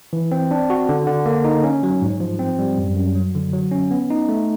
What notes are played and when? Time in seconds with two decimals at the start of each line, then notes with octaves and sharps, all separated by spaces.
0.13 E3
0.31 C4
0.51 D4
0.70 F#4
0.89 D3
1.07 D3
1.26 A#3
1.45 D#4
1.63 C#4
1.83 F#3
2.02 G#2
2.20 F3
2.39 C4
2.59 G3
2.78 F#2
2.96 F#2
3.15 F#3
3.35 D3
3.53 F#3
3.71 C#4
3.91 B3
4.10 D#4
4.29 A3